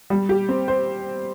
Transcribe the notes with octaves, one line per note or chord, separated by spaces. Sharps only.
G3
G4
C4
C5